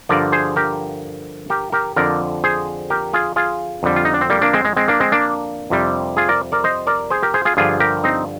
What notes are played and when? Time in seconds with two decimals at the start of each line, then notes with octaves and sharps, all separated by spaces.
0.09 G2 D3 F3 A#4 D5
0.32 G#4 C5
0.56 G4 A#4
1.50 G4 A#4
1.72 G4 A#4
1.96 F2 D3 F3 A#4 D5
2.44 G#4 C5
2.90 G4 A#4
3.13 F4 G#4
3.36 F4 G#4
3.83 F2 D3 G3
3.96 F4
4.05 D#4
4.14 D4
4.21 C4
4.30 G3 A#3
4.42 A#3 D4
4.53 G#3 C4
4.65 G#3
4.76 G#3 C4
4.88 A#3 D4
5.00 G#3 C4
5.12 A#3 D4
5.70 F2 C3 G3
6.17 F4 G#4
6.29 A#4 D5
6.52 A#4 D5
6.64 C5 D#5
6.87 A#4 D5
7.10 G#4 C5
7.23 G4 A#4
7.34 G#4 C5
7.45 F4 G#4
7.57 G2 D3 F3 F4 G#4
7.80 G4 A#4
8.04 C4 D#4